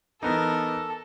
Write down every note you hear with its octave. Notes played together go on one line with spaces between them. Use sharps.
E3 B3 D#4 A4 A#4